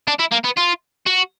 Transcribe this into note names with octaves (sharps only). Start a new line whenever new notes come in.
D4
E4
A#3
B3
F4
F#4